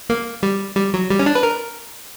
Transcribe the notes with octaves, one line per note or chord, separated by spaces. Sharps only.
A#3
G3
G3
F#3
G3
C#4
D4
B4
A#4